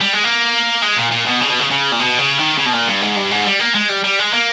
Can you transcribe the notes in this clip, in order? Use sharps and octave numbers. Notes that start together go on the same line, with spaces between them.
G3
G#3
A#3
G#3
A#2
A#2
B2
C#3
B2
C#3
C#3
A#2
B2
C#3
D#3
C#3
B2
A#2
G2
G#2
G2
G#2
G3
A#3
G#3
G3
G3
G#3
A#3